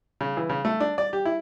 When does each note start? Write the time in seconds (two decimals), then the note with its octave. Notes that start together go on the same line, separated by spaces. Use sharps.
0.21 C#3
0.37 E3
0.50 C#3
0.65 A3
0.80 D4
0.98 D5
1.13 G4
1.25 E4